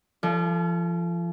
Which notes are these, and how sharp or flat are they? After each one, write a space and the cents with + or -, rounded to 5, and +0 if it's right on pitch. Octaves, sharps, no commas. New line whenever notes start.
F3 -35 A4 +0